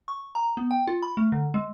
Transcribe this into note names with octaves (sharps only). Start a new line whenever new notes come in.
C#6
A#5
B3
G5
F4
B5
A3
D3
G#3